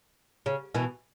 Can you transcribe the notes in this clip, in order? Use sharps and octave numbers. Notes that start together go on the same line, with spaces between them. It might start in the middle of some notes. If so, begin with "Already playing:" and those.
C#3
B2 E3